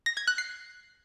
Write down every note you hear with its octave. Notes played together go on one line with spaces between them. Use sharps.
A#6
G#6
F#6
C7